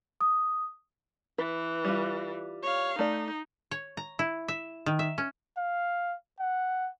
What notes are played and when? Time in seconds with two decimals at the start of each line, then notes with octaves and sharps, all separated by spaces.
0.21 D#6
1.38 E3 B4
1.85 G3 F4
2.63 C#5 F5
2.99 A3 D#4 D5
3.71 C#5
3.97 A#5
4.19 E4
4.48 E5
4.86 D#3
4.99 E5
5.18 C#4
5.57 F5
6.40 F#5